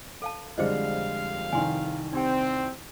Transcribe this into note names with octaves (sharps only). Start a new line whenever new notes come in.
A4 F5 A5
F2 D3 G3 G#3 G#4 C5 D#5 F5
C2 D#3 G#5 C6
C4 D#4 G4 G5